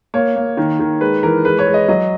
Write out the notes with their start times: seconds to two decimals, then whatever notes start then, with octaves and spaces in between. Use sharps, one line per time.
0.14 A#3 C#5
0.36 A#3
0.57 D#3
0.80 D#3
1.01 G#3 B4
1.23 E3 A#4
1.45 G#3 B4
1.59 C#5
1.67 G#3
1.74 D#5
1.88 F#3 D#5